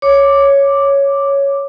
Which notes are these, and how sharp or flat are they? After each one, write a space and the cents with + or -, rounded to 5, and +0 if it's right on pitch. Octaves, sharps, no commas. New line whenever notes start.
C#5 +0 D6 +0